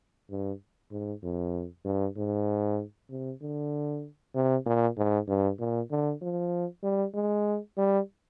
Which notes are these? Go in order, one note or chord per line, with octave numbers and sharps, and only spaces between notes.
G2
G#2
F2
G2
G#2
C3
D3
C3
A#2
G#2
G2
A#2
D3
F3
G3
G#3
G3